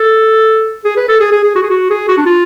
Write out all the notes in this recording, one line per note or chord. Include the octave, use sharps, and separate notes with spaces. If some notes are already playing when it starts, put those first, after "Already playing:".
Already playing: A4
G#4
B4
A4
G#4
G#4
G#4
F#4
G#4
F#4
G#4
F#4
D4
F4